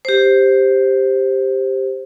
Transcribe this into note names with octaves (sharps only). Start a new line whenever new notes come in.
G4 C5